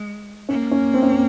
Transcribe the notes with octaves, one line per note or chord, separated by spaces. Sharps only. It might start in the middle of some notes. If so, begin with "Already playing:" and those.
Already playing: G#3
A#3 C#4
C#4
C4
C#4
C4